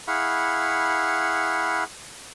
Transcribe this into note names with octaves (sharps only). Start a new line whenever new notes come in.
E4 G#4 F5 F#5 B5 C#6